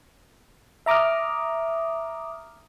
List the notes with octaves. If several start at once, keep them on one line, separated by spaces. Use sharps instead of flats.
E5 A#5 D6 D#6 F6